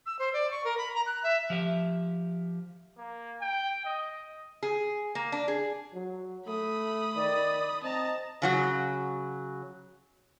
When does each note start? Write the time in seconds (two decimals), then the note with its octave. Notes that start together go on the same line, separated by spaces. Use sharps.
0.06 E6
0.19 C5
0.33 D5
0.51 C#6
0.64 A#4
0.78 B5
0.94 A#5
1.06 F#6
1.23 E5
1.50 F3 G4 E5
2.98 A#3
3.41 G5
3.86 D#5
4.63 G#4
5.15 A#3
5.32 D4
5.48 G#4
5.94 F#3
6.47 A3 B5 D#6
7.16 D#3 D5
7.83 C4 D#5 A5 A#5
8.42 C#3 F#3 F#4